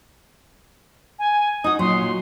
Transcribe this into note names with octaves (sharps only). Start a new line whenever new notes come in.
G#5
D#4 F#4 D#6
A#2 F#3 C6